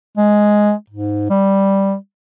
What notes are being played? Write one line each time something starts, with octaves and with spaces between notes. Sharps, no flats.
G#3
G#2
G3